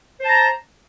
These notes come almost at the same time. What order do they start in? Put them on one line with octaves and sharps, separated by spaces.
C5 A5 A#5